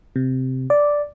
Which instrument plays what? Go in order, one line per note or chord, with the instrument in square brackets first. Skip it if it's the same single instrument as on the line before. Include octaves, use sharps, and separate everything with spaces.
[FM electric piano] C3
D5